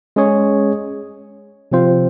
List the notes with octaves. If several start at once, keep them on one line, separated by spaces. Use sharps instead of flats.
G#3 C#4 G#4 C#5
C3 F3 C4 F4 C5